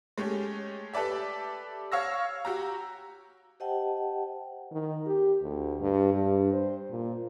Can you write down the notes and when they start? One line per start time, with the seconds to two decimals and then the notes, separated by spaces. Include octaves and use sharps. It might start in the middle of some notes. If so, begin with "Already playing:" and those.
0.18 G#3 A3 C#4 G4
0.93 G4 A4 B4 D5 E5
1.92 C#5 F5 C#6 E6 F6 A#6
2.45 F#4 G4 A#5
3.60 G4 C5 D#5 F#5 G5 A5
4.72 D#3
5.06 G4
5.42 D2
5.80 G2
6.13 G2
6.53 C5
6.90 A#2